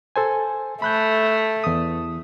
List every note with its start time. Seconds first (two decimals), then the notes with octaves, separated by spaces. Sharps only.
0.16 A4 C5 G#5
0.82 A3 B5 F#6 G6
1.64 E2 D#6